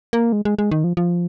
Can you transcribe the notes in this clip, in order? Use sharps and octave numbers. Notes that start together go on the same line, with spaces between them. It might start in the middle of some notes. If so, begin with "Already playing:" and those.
A#3
G#3
G#3
G#3
D#3
F3
F3